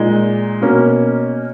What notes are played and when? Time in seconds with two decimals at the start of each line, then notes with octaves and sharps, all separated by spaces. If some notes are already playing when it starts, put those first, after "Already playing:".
Already playing: A#2 G#3 D#4
0.62 B2 A#3 C#4